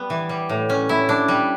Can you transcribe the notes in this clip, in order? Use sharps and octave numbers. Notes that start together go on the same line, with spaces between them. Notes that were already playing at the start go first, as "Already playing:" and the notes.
Already playing: G3 B3
E3
G3
A2
C#4
E4
D4
G3